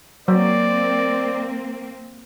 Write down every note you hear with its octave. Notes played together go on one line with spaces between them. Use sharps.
F#3 A#3 C4 D5